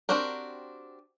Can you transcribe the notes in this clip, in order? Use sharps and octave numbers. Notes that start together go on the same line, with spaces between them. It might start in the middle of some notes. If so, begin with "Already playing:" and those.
C4 D4 F#4 G4 A#4